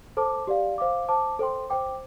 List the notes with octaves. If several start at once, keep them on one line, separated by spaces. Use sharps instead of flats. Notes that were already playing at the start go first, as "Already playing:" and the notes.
A4 C5 A5 D6
G4 D5 F5
C5 F5 D6
C5 A5 D6
A4 C5 G5 C6
C5 G5 D6